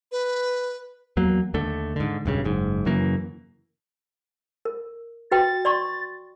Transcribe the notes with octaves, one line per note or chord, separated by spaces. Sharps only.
B4
E2 F#3 A#3
D#2 D3 A3
G#2 D3
E1 G2 C#3
F#1 G#2
F#2 C#3 E3 A#3
A#4
F#4 B4 G5 A6
D5 C6 C#6